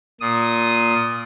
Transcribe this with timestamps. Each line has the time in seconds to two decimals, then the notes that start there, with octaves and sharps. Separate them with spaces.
0.20 A#2 D#6